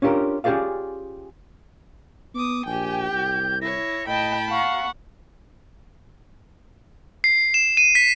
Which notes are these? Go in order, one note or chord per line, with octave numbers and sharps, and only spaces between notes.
C#4 D4 F4 G4 A#4
C#4 F4 G4 G#4 D5 F5
B3 D6 D#6
A#1 G4 G5 G#5
C2 G6
E4 C#5 A#6
A2 D#5 G5 A5 B5
F5 F#5 C#6
C7
E7
D#7
B6